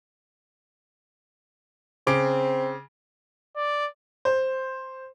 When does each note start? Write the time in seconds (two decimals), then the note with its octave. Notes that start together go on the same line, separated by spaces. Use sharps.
2.07 C#3 C4 D6 D7
3.56 D5
4.25 C5